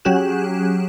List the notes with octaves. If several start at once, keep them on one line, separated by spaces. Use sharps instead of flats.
F#3 C#4 G4 G#4 F#6 E7